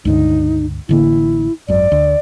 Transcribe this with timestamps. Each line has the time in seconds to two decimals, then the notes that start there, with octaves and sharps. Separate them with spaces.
0.05 C#2 G2 D3 D#4
0.89 A1 D3 A#3 E4
1.68 G#1 F#2 D5
1.92 D2